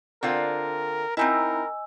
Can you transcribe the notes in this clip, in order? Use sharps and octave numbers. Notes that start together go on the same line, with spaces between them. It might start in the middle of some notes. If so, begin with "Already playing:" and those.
D3 C4 F4 A#4
C4 D#4 E4 A#4 D#5 G#5 E6